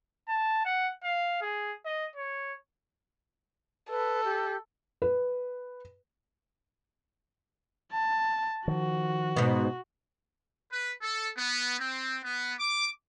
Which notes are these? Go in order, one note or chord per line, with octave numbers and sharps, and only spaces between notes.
A5
F#5
F5
G#4
D#5
C#5
A4 B4
G4
B4
A5
D#3 F3 F#4
G#2 B2
B4
A4
B3
C4
B3
D6